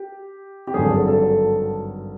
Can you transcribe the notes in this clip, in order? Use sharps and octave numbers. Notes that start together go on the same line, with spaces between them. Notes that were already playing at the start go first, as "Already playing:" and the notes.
Already playing: G4
G4
G#1 G2 D3 F#3 G#4
A4
A4